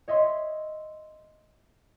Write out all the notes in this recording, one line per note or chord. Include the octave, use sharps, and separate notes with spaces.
C#5 D#5 E5 C6